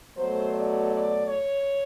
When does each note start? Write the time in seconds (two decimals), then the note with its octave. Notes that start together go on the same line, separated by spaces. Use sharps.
0.17 B2 F#3 A3 C5
0.54 D5
0.91 D5
1.28 C#5